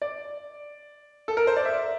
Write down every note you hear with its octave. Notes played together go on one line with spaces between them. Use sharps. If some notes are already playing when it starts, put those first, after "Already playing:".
D5
A4
A#4
C5
D5
E5